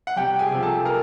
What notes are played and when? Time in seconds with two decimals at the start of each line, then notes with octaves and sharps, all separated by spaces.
0.07 F#5
0.16 C2 G4 G5
0.39 G#4 G#5
0.51 C3 F3
0.63 A4 A5
0.85 A#4 A#5